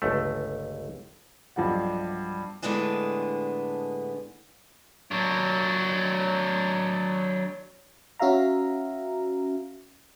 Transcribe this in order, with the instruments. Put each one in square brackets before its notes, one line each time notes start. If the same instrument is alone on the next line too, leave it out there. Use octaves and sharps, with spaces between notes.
[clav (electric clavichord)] G1 C#2 A3
[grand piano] B1 G2 F3 G3 F#5
[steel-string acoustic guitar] A2 D3 G#3 B3 D4 G#4
[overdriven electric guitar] F#3 D4
[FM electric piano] C#4 F#4 E5 F5 A#5